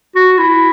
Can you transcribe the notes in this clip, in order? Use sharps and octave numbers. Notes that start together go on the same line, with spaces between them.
F#4
E4